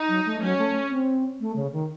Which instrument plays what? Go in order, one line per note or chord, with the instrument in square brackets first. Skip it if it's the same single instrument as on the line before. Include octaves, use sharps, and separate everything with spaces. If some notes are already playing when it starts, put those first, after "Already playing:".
Already playing: [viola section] D#4
[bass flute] F#3
A3
[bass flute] F#3 [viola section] C#4
[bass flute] A3
C4
A3
C#3
D#3